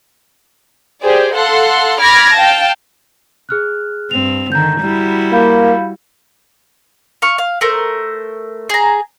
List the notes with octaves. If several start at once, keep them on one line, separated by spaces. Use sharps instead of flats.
G4 G#4 C5 D5
A4 F5 F#5 C6
B5 D6 F6 G#6 A#6
F5 G5 A5
G#4 F6 F#6
G2 C4 F7
D3 D#3 A#5 G6
G3 E4 F#4
A#3 F5 B5 G6
F5 C#6
F5
A3 A#4 C5
G#4 A#5